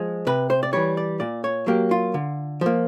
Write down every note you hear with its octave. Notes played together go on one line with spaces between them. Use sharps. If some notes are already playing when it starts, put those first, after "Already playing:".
Already playing: F3 G#3
C3 B4
C5
D5
E3 G3 C#5
D5
A#2 D5
C#5
F#3 A#3 G4
F4
D3
F3 A#3